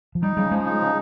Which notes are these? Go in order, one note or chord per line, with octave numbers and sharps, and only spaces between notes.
F3
G3 D#4
C#3 G3
F3 G#3
D#4
C#3